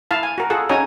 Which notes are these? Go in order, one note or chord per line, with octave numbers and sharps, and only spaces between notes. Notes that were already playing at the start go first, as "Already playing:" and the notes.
E4 F5 A5
G#5
F#4 A#4
F4 G#4 A4 F#5
C#4 D#4 F#4 C#5 G#5 A#5